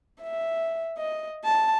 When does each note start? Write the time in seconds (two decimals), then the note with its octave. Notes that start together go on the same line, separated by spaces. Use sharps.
0.22 E5
0.98 D#5
1.44 A5